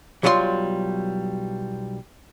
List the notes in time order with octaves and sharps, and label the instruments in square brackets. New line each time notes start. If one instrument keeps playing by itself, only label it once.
[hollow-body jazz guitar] B1 F#3 G3 F4 G#4 C6